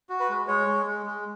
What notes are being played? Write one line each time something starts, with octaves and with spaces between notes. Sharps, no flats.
F#4
B4
G#3
G#3 C#5
G#3
G#3
G#3